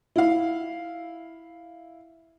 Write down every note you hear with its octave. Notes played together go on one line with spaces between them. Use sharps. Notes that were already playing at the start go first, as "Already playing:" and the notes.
E4 F5